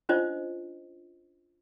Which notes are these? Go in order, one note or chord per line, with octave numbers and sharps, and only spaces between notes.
C#4 D4 F4 C5 C#5 D#5